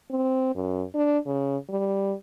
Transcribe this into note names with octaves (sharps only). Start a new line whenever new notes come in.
C4
F#2
D4
C#3
G3